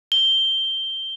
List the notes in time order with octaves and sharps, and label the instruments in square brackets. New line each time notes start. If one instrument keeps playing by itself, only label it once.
[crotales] G7